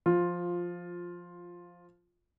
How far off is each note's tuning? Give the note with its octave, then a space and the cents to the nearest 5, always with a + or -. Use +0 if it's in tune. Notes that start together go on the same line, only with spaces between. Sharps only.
F3 +0 F4 +10